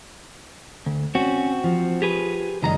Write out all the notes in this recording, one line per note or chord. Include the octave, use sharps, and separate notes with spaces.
D2
C4 C#4 F#4
F3
G4 G#4 B4
C#2 F#2 D#3 G4 D#5 A#5